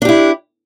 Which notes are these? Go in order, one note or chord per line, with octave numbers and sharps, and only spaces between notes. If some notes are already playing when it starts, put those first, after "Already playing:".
D4 E4 G4